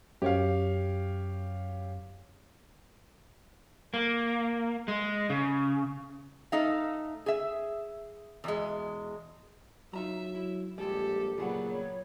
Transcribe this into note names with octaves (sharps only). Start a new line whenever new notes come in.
F#2 G4 C#5 F5
A#3
G#3
C#3
A3 D#4 F5
G#4 E5
E2 B2 G#3
F#3 D#4 F4 E5 A#5
E4
A#1 G3 G#3 G4 A4
A#2 C#3 F#3 G3 B3 G#4 F#5
C#5